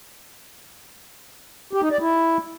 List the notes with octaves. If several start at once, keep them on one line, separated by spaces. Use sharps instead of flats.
G4
D#4
D5
E4